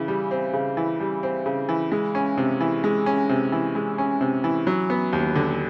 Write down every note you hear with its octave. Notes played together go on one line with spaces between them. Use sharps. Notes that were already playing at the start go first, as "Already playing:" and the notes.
Already playing: C#3 E3
G3
C4
C#3
E3
G3
C4
C#3
E3
G#3
C#4
C3
E3
G#3
C#4
C3
E3
G#3
C#4
C3
E3
F#3
B3
D#2
D3